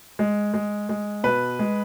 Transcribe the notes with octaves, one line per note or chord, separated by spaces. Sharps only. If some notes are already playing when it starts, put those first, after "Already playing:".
G#3
G#3
G#3
B2 B4
G#3